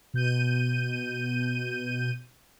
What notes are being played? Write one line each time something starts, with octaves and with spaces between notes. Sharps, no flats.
B2 G6 D#7